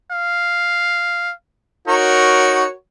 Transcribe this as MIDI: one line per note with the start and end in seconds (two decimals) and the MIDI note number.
0.11 1.33 77
1.88 2.65 63
1.88 2.71 66
1.88 2.71 70
1.88 2.71 73